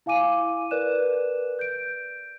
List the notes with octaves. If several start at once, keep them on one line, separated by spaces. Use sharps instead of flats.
E4 F5 G#5 D6 D#7
A#4 B4 D5 F#6 E7
G6 D7